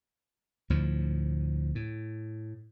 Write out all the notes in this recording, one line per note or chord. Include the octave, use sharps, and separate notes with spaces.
D2 A2 F3
A2